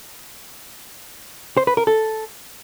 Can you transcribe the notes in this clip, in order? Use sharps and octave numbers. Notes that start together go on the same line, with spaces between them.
C5
B4
A#4
A4